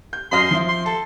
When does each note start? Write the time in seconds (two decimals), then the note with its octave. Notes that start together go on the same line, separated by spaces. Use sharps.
0.13 G6
0.32 F#2 D#5 C6 F6
0.51 F3 E5
0.69 C6
0.86 A4 A5